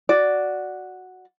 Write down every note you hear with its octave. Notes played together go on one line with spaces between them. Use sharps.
F#4 D5